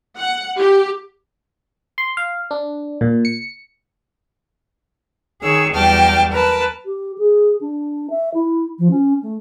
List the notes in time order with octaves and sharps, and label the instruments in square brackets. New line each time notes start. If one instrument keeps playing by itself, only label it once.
[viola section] F#5
G4
[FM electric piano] C6
F5
D4
A#2
C#7
[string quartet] D#3 G#4 C#5 E6
E2 F#3 G3 G5 A5 F6
A#4 B4 A5
[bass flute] G4
G#4
D4
E5
E4
F3
C#4
A3